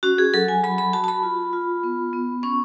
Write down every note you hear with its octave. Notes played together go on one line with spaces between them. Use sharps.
C#4 F#4
G#4
F#3 A4
G#5
F#3 B5
B5
F#4 A5
A5
B5
F4
F4
B3
B3
C#4 C#6